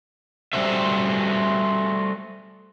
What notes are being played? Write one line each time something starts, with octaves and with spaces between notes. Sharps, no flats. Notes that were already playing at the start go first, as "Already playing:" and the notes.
G3 A3 F#4 C5 E5